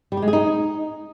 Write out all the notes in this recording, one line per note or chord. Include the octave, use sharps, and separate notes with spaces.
G3
G4
G#3
G#4
D#4